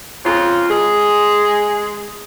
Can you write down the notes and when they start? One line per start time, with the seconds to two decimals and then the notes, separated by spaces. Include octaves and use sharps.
0.24 F2 C#3 F4
0.69 G#3 G#4